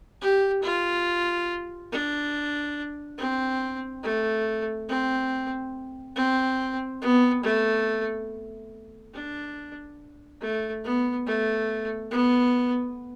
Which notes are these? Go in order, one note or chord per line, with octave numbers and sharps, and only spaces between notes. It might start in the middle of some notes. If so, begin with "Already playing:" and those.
G4
F4
D4
C4
A3
C4
C4
B3
A3
D4
A3
B3
A3
B3